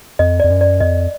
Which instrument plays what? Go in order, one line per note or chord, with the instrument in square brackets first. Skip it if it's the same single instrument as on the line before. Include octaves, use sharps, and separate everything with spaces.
[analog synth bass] F2 [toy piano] D#5
[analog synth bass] F2 [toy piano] D5
[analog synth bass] F#2
[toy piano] D5
[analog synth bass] F2 [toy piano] D#5